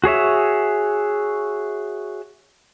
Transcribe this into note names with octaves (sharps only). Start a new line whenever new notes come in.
F#4 G#4 C#5 E5